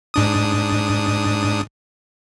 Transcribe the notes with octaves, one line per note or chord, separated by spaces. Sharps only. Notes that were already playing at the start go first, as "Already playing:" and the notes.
G#2 D4 D#6